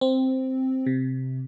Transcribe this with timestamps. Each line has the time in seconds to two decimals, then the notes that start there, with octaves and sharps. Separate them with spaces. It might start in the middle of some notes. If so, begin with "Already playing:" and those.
0.01 C4
0.86 C3